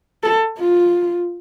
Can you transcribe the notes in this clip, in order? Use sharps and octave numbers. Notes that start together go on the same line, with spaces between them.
A4
F4